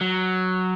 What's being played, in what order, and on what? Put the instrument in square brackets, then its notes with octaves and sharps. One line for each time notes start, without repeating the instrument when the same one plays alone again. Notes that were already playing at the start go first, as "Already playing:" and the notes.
[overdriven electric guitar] F#3